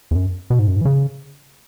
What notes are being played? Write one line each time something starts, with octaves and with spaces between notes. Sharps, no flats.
E2
F#2
B2
G#2
F#2
G#2
E3
C#3